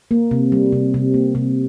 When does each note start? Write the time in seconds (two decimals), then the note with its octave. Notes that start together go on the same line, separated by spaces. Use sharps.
0.11 A#3
0.31 C3
0.52 G3
0.72 C3
0.94 C3
1.14 A#3
1.35 C3